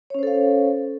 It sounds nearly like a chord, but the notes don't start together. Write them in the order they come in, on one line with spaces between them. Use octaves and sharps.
C#5 C#4 C5 A4 F5